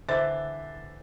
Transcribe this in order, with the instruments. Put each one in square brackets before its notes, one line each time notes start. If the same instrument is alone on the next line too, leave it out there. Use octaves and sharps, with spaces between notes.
[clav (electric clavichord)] D3 E3 [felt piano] C5 E5 A6